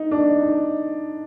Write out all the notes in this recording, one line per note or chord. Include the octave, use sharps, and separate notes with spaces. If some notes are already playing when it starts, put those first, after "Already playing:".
Already playing: D#4
D4
D#4